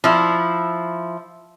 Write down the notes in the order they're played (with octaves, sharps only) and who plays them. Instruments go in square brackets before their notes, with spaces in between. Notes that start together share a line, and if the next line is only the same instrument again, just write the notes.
[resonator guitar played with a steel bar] F3 E4